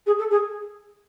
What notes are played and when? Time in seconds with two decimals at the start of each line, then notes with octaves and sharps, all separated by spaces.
0.06 G#4
0.18 A4
0.30 G#4